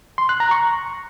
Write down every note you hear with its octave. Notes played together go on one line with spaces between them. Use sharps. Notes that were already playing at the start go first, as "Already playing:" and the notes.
C6
F#6
A#5
C#6